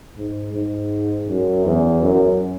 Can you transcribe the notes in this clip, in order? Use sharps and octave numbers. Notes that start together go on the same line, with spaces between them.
G#2
G#2
F#2
E2
F#2